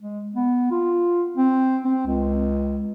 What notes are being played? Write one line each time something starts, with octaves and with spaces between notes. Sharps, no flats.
G#3
B3
F4
C4
C4
C#2